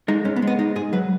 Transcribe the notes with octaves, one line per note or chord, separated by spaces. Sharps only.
G#3 D#4
G#2 C#4
B3
G#3
B3
G#2 D#4
G#2 G#4
F#3 B4